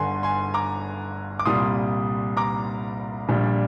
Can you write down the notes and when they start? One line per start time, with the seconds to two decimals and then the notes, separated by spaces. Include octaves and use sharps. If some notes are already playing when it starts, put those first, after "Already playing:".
Already playing: G1 G2 D3 G#5 C6
0.23 G#5 C6
0.54 A#5 D6
1.39 D6
1.45 C2 A#2 G3 C6 D#6
2.37 A#5 D6
3.28 A#1 A#2 G3